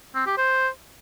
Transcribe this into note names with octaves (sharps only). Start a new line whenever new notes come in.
C4
G4
C5